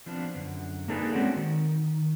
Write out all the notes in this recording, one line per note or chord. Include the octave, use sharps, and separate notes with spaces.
F3 B3 C4 D4
F#2 D3
A#3 D4 D#4 G#4 A4 B4
G#3 C4 C#4 F#4 C5 D5
D#3